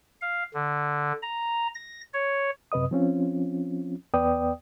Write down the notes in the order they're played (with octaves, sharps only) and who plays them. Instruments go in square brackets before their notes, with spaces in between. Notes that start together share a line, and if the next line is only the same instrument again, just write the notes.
[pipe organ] F5
D3
A#5
A#6
C#5
[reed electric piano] F#2 C3 B4 D#5 D#6
F3 C4 C#4 F4
E2 B3 B4 D5 G5 D#6